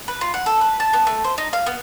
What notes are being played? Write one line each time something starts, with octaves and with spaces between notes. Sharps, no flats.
B4
F4
F#5
A4
B4
A5
B3
A3
C5
D#4
F5
B3